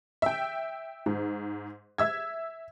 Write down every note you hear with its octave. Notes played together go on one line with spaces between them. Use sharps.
E5 G5
G#2
E5 E6 G#6